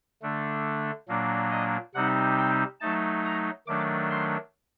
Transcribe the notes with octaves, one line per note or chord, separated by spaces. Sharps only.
D3 A3 D4
A#2 F#3 A#3 D4
D#5
C3 G3 C4 D#4 F#5
G5
F#3 A3 D#4 A5
A#5
D#3 F#3 A3 D4 D6
C6